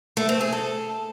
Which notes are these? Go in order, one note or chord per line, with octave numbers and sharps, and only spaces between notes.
A3
C4
G#4
A4